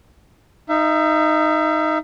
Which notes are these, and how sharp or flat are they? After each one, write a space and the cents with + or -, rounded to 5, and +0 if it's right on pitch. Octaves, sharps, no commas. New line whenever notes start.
D#4 +0 E5 +30